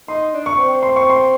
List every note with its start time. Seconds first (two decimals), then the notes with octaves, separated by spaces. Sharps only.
0.08 D#4 C6
0.34 D4
0.46 C#6
0.58 C4
0.83 C6
0.96 C#6
1.10 C6